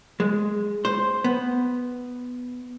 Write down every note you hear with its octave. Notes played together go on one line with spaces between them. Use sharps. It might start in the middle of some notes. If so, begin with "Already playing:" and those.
G#3
C5
B3